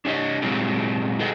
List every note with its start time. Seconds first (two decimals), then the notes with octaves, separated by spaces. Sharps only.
0.05 D4 G4 C#5 D#5
0.42 A#2 F#3 G#3 C4 E4 G4
1.19 F#4 G#4 A4 B4 D#5 G5